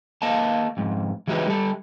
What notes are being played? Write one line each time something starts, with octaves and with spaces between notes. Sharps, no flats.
A#3 D#5 F5 A5
F2 G#2
E3 G#3 D#4 F#4 G4 B4
G3 A4